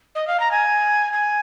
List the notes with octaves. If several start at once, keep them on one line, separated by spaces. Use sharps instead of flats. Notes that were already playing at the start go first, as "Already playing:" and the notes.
D#5
F5
A#5
G#5
G#5